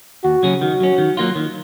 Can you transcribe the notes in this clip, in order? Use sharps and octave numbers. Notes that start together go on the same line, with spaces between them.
D#2 F#4
C#3 F#3 C#4 G#4
D#3 F#4
F#3 C#4
D#3
F#3 A#3 F4
D#3